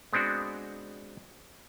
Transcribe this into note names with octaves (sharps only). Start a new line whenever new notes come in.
G#3 B3 C4 D4 F#4